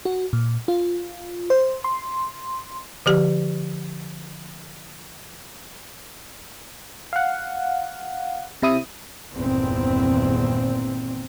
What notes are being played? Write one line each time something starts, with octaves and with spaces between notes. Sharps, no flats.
F#4
A#2
F4
C5
C6
D3 F3 G4
F5 F#5
C3 E4 D#6
G1 E2 A#2 D#3 C4